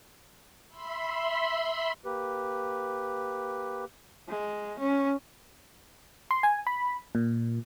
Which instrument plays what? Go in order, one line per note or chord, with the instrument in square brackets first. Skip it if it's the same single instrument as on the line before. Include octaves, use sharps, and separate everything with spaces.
[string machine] E5 B5 C6
[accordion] A#3 G4 B4
[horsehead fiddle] G#3
C#4
[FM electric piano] C6
G#5
B5
A#2